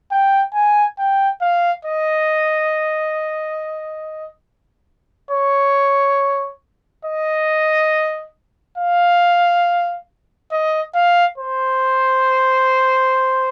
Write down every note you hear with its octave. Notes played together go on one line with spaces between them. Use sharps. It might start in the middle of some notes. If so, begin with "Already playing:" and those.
G5
G#5
G5
F5
D#5
C#5
D#5
F5
D#5
F5
C5